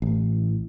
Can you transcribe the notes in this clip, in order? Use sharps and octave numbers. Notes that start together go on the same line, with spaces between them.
A1